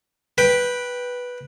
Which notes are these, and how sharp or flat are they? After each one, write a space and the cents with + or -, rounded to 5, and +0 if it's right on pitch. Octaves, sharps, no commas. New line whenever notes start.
B4 -5 G5 +5